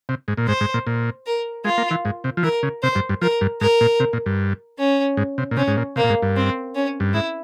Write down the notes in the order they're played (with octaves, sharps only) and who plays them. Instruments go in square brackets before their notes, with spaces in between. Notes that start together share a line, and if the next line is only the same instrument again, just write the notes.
[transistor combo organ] C3
G#2
A#2
[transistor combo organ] G#2 [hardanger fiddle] C5
[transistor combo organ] G#2
A#2
A#2
[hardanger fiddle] A#4
[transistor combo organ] G#3 [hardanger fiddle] F4
[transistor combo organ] A#3
E3
G#2
C3
F3
[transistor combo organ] E3 [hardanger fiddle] A#4
[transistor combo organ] C#3
[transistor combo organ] C3 [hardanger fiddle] C5
[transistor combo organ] G2
G2
[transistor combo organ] F3 [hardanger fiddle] A#4
[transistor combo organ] G2
[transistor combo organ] G#2 [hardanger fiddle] A#4
[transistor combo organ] A#2
C3
A#2
G2
[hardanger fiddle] C#4
[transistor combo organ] G#2
C3
A#2
[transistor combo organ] C3 [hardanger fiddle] C#4
[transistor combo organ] G#2
A#2
[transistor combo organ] C3 [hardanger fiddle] A#3
[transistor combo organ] A#2
G#2
G2
[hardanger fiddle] C4
C#4
[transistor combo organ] G2
[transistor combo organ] G#2 [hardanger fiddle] E4